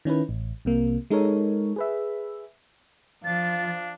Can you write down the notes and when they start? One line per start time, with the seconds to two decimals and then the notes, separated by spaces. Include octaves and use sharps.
0.05 D#3 C#4 E4 B4
0.29 A1
0.65 C2 C3 A#3
1.10 G#3 D#4 A4 A#4 C#5
1.76 G#4 B4 E5
3.24 F3 D4 F5 A6